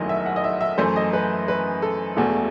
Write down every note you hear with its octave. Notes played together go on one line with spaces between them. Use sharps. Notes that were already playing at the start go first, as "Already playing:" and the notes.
Already playing: F#1 E2 D#3 F#3 A3 E4 F#4 D#5
E5
F#5
D#5
E5
E5
F#2 E3 A3 C5
D#5
B4
B4
A4
E1 E2 B2 A3